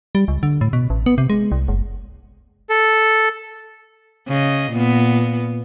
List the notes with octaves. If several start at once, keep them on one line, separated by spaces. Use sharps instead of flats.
G3
C#2
D3
A2
B2
A1
B3
C3
G#3
C2
F#1
A4
C#3 D#5
A#2 B3